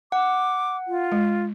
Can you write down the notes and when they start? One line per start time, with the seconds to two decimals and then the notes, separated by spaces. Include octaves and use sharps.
0.12 F#5 D6
0.88 F4
1.12 G#3